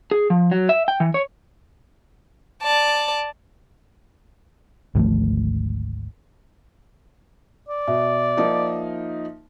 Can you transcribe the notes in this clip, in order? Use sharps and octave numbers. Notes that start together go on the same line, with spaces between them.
G#4
F3
F#3
E5
G5
E3
C#5
D5 A5
G#1 D2 F3 A3
D5
B2 E5
F3 A#3 D#4